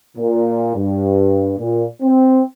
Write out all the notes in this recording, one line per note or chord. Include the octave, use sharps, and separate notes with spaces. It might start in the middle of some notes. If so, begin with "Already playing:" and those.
A#2
G2
A#2
C4